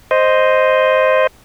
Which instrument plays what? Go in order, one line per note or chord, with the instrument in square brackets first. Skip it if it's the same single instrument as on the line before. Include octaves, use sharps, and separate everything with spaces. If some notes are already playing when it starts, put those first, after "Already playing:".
[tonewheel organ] C5 D#5